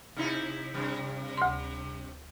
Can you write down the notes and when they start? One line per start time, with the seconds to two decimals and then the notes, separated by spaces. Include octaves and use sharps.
0.16 C3 D#4 E4
0.74 G2 C3
1.37 D2 C6